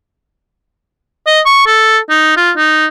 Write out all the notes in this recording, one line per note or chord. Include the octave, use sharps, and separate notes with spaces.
D#5
C#6
A4
D#4
F4
D#4